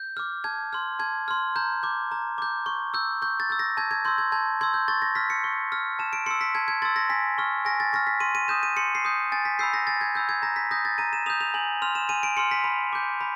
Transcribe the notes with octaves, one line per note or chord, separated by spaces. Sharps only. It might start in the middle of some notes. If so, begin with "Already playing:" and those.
Already playing: G6
D6 F6
A5 G#6
C6 F6
A5 G#6
C6 F6
A#5 G6
D6 G6
A#5
D6 G6
C#6
E6 G6
C#6 G6
A6
E6 G6
A#6
A5 G#6
G#6
C6 E6 G6
G#6
A5 G#6
C6 E6 G#6
G6
C#6 A6
A#6
F6 B6
C#7
C#6
F6
A5 E7
D7
C6 E6 C#7
B6
A5 G#6
G#6
C6 E6 A6
A#6
G#5 B6
C#6 F6
G#5 A#6
A6
C#6 F6 A#6
B6
C6 D#7
D#7
D#6 G6 E7
D#7
C6 C#7
C7
D#6 G6
G#5 A6
B6
B5 E6 G6 C7
A#6
G#5 A6
G#6
B5 E6 G6
G#6
A#5 A#6
B6
D#6 G6 A#6
A6
A#5 D#7
E7
D#6 G6 F7
F7
G#5 F#7
C6 F6 F7
E7
G#5 D#7
D7
C6 F6 C#7
B6
B5
D6 G6
B5